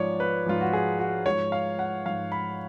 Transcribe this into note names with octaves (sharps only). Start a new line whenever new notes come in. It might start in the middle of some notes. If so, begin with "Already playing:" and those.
Already playing: G#2 F3 C#5 D5
B4
G#2 F3 F4
F#4
G#4
F#4
G#2 F3 C#5
F5
F#5
G#2 F3 F5
B5